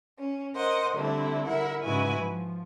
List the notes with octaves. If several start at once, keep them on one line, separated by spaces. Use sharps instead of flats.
C#4
A#4 C5 D#5 F#5
D3 G3 A3 C4 D4 E4
E4 A#4 E5 F#5
G#2 C#3 E4 F#4 B4 G#5
F3